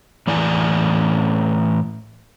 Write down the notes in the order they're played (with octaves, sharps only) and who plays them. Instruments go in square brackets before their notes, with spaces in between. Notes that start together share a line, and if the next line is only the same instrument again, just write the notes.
[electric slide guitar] A2 E3 D5 F#5 G#5 A#5